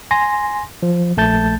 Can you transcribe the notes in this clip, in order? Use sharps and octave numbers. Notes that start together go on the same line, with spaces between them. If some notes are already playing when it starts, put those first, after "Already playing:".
G#5 C6 A#6
F3
A#1 A3 A5 G6 A6